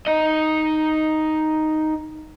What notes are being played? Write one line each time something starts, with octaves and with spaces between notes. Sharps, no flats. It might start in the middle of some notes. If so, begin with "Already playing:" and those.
D#4 D#5